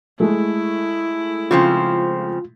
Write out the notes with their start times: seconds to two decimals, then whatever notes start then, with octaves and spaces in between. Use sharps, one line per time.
0.20 G#3 A3 E4
1.51 C#3 F3 C4 F4